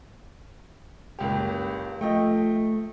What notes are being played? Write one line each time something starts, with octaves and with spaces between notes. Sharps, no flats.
F#1 C#2 G4
F3 A3 D#5 G5